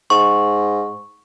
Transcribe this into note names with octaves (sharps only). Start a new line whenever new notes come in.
G#2 C#6